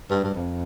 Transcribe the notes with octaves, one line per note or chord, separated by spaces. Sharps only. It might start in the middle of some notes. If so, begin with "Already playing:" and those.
G2
G2
F2